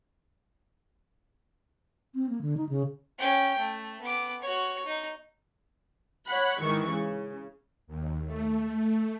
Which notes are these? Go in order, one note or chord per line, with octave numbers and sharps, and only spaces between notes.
C4
A#3
D3
D#4
C#3
C#4 G5
A3
B3 D6
F#4 C#5
D#4
C#5 F#5 B5
G#2 D#3 E3 C#6
C#3
D#2
A3